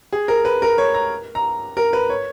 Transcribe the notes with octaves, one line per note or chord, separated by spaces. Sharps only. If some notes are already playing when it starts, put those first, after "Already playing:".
G#4
A#4
B4
A#4
C#5
A#5
A#5
A#4
B4
C#5